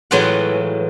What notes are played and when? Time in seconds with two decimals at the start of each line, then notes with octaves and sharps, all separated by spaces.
0.11 A2 E3 F#3 G#3 F4 F#5